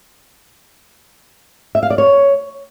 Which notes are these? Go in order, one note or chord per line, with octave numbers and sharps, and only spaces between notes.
E5
F5
D5
C#5